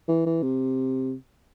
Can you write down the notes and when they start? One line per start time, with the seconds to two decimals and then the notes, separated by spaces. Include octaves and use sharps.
0.08 E3
0.26 E3
0.43 C3